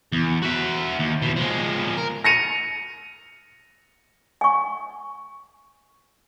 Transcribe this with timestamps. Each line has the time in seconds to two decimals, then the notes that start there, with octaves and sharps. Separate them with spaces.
0.12 E2
0.43 F#4 E5
0.99 D#2
1.22 E2 B2
1.36 F3 G#3
1.98 A#4
2.24 A#6 C#7 D#7 F7
4.41 G#5 C#6